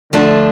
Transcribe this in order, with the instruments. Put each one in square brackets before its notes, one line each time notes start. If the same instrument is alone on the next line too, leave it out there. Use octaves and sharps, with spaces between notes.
[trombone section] D3 [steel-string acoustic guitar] F3 A3 D4 A4